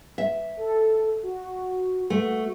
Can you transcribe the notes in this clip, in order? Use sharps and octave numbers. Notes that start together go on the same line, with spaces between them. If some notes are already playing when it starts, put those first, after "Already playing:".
E5
A4
F#4
A3 F#4